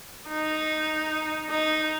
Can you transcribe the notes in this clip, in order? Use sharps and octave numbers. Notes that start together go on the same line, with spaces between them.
D#4
D#4